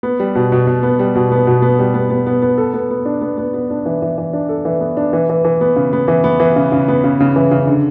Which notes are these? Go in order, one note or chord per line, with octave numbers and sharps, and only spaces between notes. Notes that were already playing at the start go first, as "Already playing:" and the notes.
B3
G3
B2
B2
B2
B3
G3
B2
B3
B2
B3
G3
B3
B3
B3
B3
A4
B3
B3
D4
B3
B3
B3
D4
E3
E3
E3
D4
A4
E3
B3
D4
E3
E3
E3
B3
C#3
B3
E3
B3
E3
C#3
C#3
B3
C#3
C#3
E3
C#3
D3